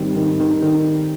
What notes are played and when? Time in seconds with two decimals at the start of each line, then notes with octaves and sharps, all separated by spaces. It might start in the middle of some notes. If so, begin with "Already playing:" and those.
Already playing: D#3 G3 C4
0.16 D#3
0.40 D#3
0.62 D#3